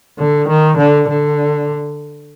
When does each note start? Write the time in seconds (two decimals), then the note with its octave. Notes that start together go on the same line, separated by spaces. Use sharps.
0.19 D3
0.49 D#3
0.78 D3
1.09 D3